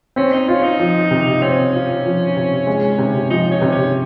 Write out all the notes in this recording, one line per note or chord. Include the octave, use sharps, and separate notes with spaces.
C4 C#4
D#4
C#4 F4
D#4
F3
C3
C4 C#4
F4
F3
C3
G#3
C3
F3 D#4
C#4
C3
C#4